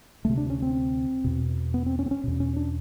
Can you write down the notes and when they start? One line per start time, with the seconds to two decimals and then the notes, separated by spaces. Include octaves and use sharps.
0.25 D2 C3 A3
0.37 D4
0.50 C#4
0.62 C4
1.24 E2 B2
1.74 B3
1.86 C4
1.99 C#4
2.06 C4
2.11 C#4
2.24 E2 B2
2.40 C#4
2.56 D4